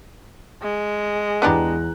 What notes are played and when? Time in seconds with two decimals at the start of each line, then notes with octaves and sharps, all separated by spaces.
0.62 G#3
1.42 E2 B3 D4 G4 A#5 F#6